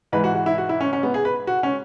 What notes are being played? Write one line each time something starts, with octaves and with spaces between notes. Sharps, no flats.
G#2 E3 B4
F#4
F#4
E4
F#4
E4
C#4
C#4
B3
G#4
B4
F#4
C#4